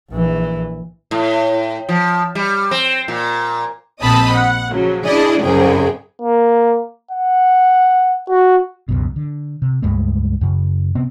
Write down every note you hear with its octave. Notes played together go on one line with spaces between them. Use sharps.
A#1 E3
A2
F3
G3
C4
A#2
A#1 C4 D#5 A5 B5 D#6
F#5
C#3 F3 F#3
D4 E4 G#4 D5 D#5
C2 F#2 C#3 G#4 G5
A#3
F#5
F#4
C#2 F#2 B2
D3
C3
C#2 G2 G#3 A3
F#2 C#3
C3 B3 C4